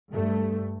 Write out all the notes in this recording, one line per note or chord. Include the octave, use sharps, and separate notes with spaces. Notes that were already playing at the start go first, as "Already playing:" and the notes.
G2 A3